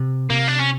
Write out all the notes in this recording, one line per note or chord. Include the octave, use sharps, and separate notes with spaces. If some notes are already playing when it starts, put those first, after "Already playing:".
Already playing: C3
C3 A#3
D4
C#4